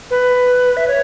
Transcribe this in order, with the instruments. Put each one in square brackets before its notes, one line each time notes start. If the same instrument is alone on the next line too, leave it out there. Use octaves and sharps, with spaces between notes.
[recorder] B4
E5
C#5